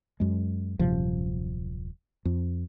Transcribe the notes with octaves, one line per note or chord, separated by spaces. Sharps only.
F#2 G#3
D#1 F#2 C3 F3
F2